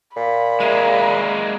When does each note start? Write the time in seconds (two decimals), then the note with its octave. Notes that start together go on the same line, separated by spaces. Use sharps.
0.16 A#2 B5
0.60 G#3 A#3 D5 E5 A#5